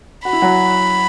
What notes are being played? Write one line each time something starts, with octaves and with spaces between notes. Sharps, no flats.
F#4 B5
E4
F#3 F#4